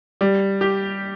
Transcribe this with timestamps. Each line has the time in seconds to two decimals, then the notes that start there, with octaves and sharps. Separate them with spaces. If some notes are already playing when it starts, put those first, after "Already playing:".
0.21 G3
0.61 G4